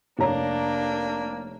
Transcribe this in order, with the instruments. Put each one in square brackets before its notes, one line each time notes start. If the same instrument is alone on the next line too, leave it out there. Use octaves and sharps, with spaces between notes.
[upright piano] F1 C#5 A#5 [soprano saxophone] A#3 [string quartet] D4